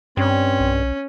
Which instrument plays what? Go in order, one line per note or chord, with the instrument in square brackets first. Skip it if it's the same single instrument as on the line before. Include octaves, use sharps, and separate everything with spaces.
[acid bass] G2 [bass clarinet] C4 [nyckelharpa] C#4
[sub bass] B1